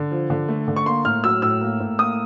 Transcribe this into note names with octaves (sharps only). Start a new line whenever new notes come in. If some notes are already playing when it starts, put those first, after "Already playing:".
Already playing: D3
F3
D3
A3
D3
C#6
A#3 C6
A2 F6
F#3 E6
A2 E6
A#3
A2
A#3 D#6